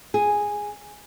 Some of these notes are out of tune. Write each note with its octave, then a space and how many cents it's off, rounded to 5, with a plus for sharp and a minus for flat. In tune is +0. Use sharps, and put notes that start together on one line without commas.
G#4 -5